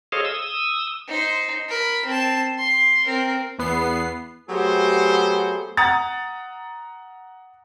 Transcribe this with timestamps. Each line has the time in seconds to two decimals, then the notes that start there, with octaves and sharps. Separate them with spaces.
0.12 G#4 A4 C5 C#5 D#5 F5
0.25 D#6 E6
1.08 D#4 C5
1.69 A#4 B5
2.05 C4 A5
2.58 C6
3.06 C4 A#4
3.58 E2 B3 C7
4.50 F#3 A3 B3 G4 G#4 C5
5.77 F#5 A#5 D#6 A6